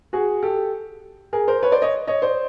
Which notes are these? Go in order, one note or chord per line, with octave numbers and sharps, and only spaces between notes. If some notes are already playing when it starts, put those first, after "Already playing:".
F#4 G#4
G4 A4
G#4 A#4
A#4 C5
B4 C#5
C5 D5
C#5 D#5
C#5 D#5
C5 D5